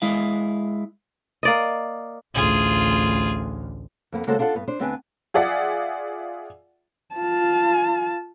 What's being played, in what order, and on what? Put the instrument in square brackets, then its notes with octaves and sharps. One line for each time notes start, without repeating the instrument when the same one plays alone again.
[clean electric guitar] G#3 E4 F5
[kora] A#3 D5 D#5
[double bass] A1 D2 [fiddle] F4 G#4
[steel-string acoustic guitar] F2 A#3 B3
C#3 G#3 A#3 F#4 A4 C5
D4 F4 A4 B4 F#5
G2 B3
D4 C5
D2 B3 C4 D4 B4 G#5
[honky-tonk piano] F4 G#4 D5 E5 F#5
[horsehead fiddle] F4 A5